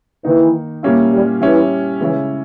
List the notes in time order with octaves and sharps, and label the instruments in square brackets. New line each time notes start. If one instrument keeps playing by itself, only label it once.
[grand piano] D#3 A#3 D#4 [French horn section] E3
[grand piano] A#2 G3 A#3 C#4 E4
[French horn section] G3
[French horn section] E3 [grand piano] G3 C#4 E4
[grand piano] C#3 G#3 C#4 E4 [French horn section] E3